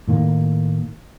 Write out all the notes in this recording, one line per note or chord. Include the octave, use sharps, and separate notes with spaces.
A2 D#3 A#3